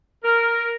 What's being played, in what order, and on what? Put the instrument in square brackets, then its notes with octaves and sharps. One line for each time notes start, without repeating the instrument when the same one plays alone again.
[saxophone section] A#4